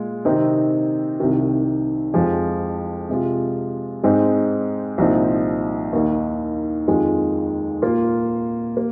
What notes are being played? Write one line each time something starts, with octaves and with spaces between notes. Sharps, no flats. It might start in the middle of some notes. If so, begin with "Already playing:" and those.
Already playing: A#2 G#3 F4
C3 D#3 C4 D#4
C2 C3 D#3
F2 F3 G#3 F4
C3 G#3 F4
G#2 G#3 C4 D#4
C2 A#2 F3 C4 D#4
D#2 D#3 A#3 D#4
F2 D#3 G#3 F4
A#2 A#3 F4
A#3